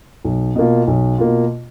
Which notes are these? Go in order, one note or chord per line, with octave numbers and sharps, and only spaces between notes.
B1
B2 A#3 F4
B1
B2 A#3 F4